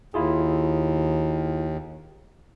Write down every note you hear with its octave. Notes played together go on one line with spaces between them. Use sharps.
D#2 E4 F4 G#4